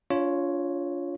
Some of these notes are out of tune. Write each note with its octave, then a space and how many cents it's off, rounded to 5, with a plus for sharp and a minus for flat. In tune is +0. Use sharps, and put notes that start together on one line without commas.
D4 -40 F4 +0 C#5 +0